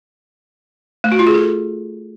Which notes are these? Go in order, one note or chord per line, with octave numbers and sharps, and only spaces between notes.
A3
F#4
F4
G#4
A4